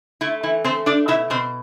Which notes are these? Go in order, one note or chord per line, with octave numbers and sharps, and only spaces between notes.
A3 E4
E3 E4
A3 C4 C5
A3 D4 D5
B2 E4 E5
B2 C4 C5